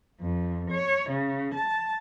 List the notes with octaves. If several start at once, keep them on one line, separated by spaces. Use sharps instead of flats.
F2
C#5
C#3
A5